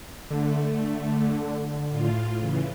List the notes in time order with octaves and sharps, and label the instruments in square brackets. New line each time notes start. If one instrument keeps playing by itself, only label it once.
[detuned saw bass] D3 [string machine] A3
[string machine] A2 F4
C#3 E3